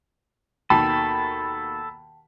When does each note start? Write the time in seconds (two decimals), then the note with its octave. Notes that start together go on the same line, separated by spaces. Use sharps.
0.70 D#2 B2 D#3 A4 G5 A5 B5